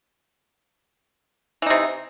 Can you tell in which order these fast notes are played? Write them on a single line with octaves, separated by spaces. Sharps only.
E3 D#4 C3